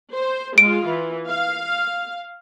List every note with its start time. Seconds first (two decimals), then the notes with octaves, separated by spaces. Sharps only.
0.13 C5
0.58 G#3 F4 D7
0.87 E3
1.28 F5